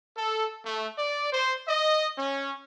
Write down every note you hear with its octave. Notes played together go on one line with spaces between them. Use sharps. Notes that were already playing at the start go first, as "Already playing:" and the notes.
A4
A3
D5
C5
D#5
C#4